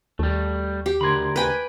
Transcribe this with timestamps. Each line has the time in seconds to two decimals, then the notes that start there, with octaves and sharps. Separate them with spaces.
0.19 D#2 G3 A3
0.86 G4
1.01 D2 D3 A#4 B5 C6 G#6
1.36 B4 G5 G#5